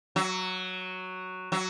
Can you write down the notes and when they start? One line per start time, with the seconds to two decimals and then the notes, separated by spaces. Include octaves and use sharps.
0.16 F#3
1.52 F#3